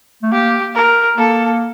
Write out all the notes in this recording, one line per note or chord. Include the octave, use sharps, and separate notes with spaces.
A3
A#3 G4
A#4
A#3 A4